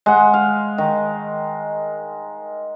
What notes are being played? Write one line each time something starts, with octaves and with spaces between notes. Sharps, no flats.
G#3 F#5
F5
D#3